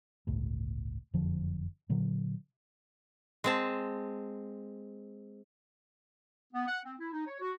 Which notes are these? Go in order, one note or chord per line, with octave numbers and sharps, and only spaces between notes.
G1 C#2 A2
F#1 F2 D3 F3
A#2 D3 F#3
G#3 C4 A5
B3
F#5
C4
E4
D#4
C#5
F#4